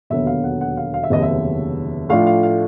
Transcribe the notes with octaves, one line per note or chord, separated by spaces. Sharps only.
E1 D#2 D3 F#3 B3 E5
F5
F#5
F#5
F5
F5
E5
F1 D#2 C#3 F#3 B3 D#5
E5
A2 F3 A3 D4 F4 F5
F5
F5